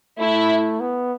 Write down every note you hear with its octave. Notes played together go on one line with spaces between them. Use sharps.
A3 E4
B3